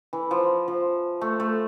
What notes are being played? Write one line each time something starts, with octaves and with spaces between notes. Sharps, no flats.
E3
F3
F3
A3
A3